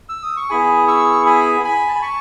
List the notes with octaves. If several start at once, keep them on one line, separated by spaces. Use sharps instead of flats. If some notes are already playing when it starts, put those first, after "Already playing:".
E6
D#6
C#6
B3 E4 G#4 G#5 B5
C#6 E6
G#5 B5
G#5 B5
A5
B5
A5 C#6